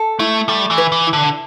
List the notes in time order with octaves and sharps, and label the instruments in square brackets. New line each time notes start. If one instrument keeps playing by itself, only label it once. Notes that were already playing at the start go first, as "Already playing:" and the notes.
Already playing: [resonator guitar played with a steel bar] A4
[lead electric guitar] A3 [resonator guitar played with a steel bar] E4
[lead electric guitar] G3 [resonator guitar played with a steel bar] A3
[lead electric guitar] E3
[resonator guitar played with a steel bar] B4
[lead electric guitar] E3
[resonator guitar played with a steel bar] E4
[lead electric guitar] D3